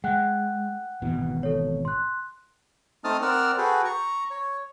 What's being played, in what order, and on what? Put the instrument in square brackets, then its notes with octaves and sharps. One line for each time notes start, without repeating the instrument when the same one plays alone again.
[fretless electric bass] G#3 [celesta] F#5 G5 F#6
[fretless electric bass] G#1 B2 E3
[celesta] A4 C#5
C6 F#6
[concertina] A3 C4 D#4 A5 D#6 F6
C4 A#4 D5 F#5 E6 F6
F#4 G#4 A4 B4 G5
A#5 C#6
C#5